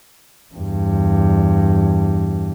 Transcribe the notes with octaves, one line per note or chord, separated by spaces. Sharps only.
E2 G2